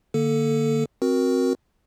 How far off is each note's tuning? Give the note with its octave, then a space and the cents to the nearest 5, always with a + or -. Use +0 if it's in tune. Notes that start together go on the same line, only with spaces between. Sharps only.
D3 +20 A#3 +0 A4 +0
C4 +10 F#4 +0 A#4 +15